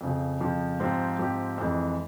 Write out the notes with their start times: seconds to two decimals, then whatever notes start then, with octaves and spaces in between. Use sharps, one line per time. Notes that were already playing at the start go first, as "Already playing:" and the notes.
0.01 F2 C#3 F3
0.41 F2 C#3 F3
0.80 G#2 F3 C4 G4
1.19 G#2 F3 C4 G4
1.58 F2 E3 G#3